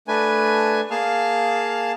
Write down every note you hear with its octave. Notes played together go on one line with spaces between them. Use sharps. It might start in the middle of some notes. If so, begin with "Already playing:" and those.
A3 D4 B4 G#5
A#3 G#4 F5 A5 F6